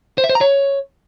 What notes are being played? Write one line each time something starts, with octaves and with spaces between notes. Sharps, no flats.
C5
E5
C5
A#5
C#5